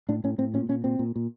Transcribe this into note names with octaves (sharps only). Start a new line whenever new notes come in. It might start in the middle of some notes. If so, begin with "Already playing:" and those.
A2 D4
A2 C#4
A2 C4
A#2 C#4
A#2 C#4
A#2 C4
A#2
A#2